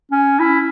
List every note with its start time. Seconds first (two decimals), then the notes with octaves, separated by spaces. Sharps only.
0.12 C#4
0.39 E4